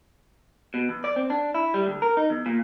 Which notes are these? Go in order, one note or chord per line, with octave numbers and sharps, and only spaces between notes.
B2
E2
D5
C4
D4
E4
G3
D2
A#4
D#4
E2
A#2